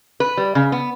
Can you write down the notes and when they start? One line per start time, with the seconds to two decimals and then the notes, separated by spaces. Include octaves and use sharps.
0.20 B4
0.37 G3
0.55 C#3
0.72 B3